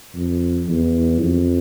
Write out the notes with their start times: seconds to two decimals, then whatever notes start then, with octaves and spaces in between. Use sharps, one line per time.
0.15 F2
0.68 E2
1.20 F2